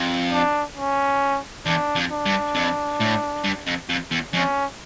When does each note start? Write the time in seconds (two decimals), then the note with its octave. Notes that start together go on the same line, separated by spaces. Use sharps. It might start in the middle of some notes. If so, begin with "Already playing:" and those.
Already playing: F2
0.32 D4
0.77 C#4
1.66 E2 D4
1.96 F2
2.11 D4
2.26 G2
2.55 F2
3.00 A2
3.44 G2
3.67 F2
3.90 F2
4.11 E2
4.34 F2 C#4